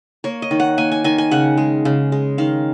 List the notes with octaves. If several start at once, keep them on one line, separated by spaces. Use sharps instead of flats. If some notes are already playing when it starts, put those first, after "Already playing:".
A#3 C#5
D#5
D#3
F#5
A#3 G#5
G#5
D#3 G#5
G#5
C#3 F#5
G#3
C#3
G#3
D#3 F5